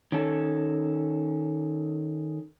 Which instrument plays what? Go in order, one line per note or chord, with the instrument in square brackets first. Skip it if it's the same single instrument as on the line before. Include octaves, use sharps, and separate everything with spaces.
[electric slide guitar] D#3 C#4 A4